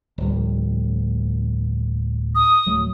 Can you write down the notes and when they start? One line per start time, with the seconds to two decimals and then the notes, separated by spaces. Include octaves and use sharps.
0.18 D1 A#1 G3
2.35 D#6
2.66 D1 F#3 A3